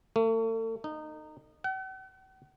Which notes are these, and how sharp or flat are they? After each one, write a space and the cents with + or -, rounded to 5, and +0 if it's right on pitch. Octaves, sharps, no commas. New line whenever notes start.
A3 +40
D#4 -20
F#5 +45